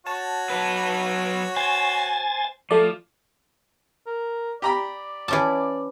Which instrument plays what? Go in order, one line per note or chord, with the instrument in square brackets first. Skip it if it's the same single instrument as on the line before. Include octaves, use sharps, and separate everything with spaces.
[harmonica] F#4 C#5 [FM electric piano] A5
[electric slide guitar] F#3 B4
[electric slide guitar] C5 [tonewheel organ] G#5 A6
[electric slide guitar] F3 [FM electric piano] A3 D5
[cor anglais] A#4
[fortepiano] G4 A#5 B5 [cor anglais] D5
[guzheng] E3 C#4 A5 [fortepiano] E4 D6